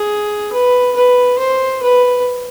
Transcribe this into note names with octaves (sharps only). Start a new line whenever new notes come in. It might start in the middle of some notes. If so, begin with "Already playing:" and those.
Already playing: G#4
B4
B4
C5
B4